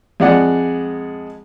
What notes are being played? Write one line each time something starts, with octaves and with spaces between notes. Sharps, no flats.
F2 G#3 D5 F#5